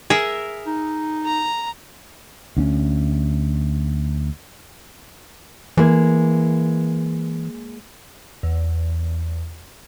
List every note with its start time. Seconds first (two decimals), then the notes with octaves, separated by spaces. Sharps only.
0.10 G#4 A#4 E5
0.67 D#4
1.24 A#5
2.57 D2 C4 C#4
5.77 E3 G#3 A#3
8.43 E2